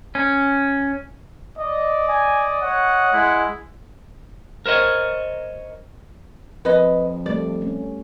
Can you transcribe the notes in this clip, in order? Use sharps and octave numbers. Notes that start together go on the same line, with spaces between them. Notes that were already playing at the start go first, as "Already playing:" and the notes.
C#4
D5 D#5
D#5 G#5
C#5 F#5
G#3 E4
A#4 C5 C#5 D#5
F2 B4 D#5
G3 A3 D5
A3 C#4